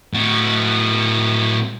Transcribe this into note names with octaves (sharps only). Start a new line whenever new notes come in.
A2 F#4